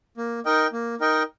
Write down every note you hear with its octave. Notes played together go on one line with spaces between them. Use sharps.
A#3
D#4 A#4 D#5 G5
A#3
D#4 A#4 D#5 G5